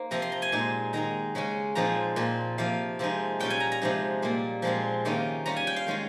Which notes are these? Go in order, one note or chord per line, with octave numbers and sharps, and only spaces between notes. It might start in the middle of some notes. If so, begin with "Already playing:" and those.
Already playing: A#3 D#4 C5
C3 F3 C4 A#5
C6
A#5
G#5
A#2 G#3 D#4
D#3 G#3 D#4 A#5
C#3 G#3 C#4
A#2 F3 G#3 C4 D#4 A#5
A#2 F3 C4
C3 F3 A#3 F5
C3 F3 G#3 D#4
A#2 G3 C#4 F4 G5
G#5
A#5
A#5
C3 F3 G#3 D#4
A#2 G3 A#3
A#2 F3 G#3 C4 F4
C3 D#3 A#3 C#4 F4
G3 C#4 F4 A#5
G#5
G5
F5
D#3 G#3 C#4 F4